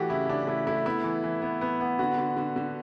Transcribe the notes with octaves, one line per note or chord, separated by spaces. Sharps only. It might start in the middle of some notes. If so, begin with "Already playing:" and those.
Already playing: E3 A3 F#4 G4
C#3 E4
C#3 D4
A3 E4
A3 E4
B3 E4
E3
E3
B3
B3
B3
D3 F#4
D3
D3
D3